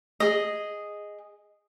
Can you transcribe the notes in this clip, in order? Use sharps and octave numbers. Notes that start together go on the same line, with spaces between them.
G#4 D#5